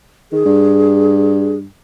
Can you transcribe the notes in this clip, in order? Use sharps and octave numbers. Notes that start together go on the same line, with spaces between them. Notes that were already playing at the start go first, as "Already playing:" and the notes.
D#3 G#4
G2